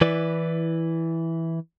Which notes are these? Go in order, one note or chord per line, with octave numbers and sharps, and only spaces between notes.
E3 E4 B4 D5